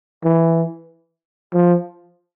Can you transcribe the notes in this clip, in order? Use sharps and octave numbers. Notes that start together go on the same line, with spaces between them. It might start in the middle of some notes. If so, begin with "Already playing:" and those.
E3
F3